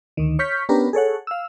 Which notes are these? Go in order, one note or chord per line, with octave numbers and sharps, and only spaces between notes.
D2 D#3
C#5 C#6 F6 G6 B6
B3 C#4 D4 G4 A#4 B4
G#4 A4 C#5 F#5
F5 E6